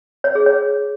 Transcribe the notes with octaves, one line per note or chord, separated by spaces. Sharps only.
C#5
G#4
C#5